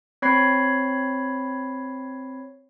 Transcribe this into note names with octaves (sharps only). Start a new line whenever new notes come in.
C4 C#5 B5 G#6 C7